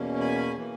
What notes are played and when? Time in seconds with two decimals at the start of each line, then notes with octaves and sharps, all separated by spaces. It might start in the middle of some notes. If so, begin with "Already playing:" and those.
Already playing: E2 B2 A#3 C#4
0.20 G#5 B5
0.57 E3 A#3